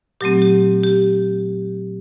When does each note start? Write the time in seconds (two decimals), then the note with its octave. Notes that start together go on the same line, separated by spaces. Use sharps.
0.21 A#2 F#3 A3 C4 G4
0.42 G4
0.84 G4